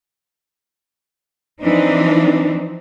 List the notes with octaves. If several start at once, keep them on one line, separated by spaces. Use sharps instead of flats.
E3 F3 C4 D4 D#4